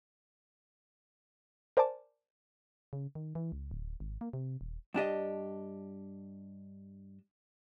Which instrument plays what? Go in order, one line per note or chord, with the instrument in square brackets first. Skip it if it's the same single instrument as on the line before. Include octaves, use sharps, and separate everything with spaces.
[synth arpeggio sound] A#4 C5 D5 G#5 A5 D6
[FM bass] C#3
D#3
E3
C#2
D1
G#1
A#3
C3
D#1
[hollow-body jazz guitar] G2 D4 G4 D#5